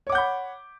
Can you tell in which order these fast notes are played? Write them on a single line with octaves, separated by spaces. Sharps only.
C#5 D6 F#5 G6 B5